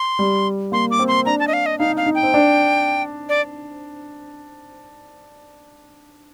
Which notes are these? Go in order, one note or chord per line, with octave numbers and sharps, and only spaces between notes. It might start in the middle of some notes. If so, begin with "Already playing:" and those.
Already playing: C6
G3
A#3 C6
D6
C4
C6
D4 A#5
A5
D#5
F5
D#5
D#4 F5
F5
D#4
G5
C4
D4
D5